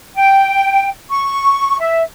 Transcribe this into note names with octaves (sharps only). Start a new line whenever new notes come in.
G5
C#6
E5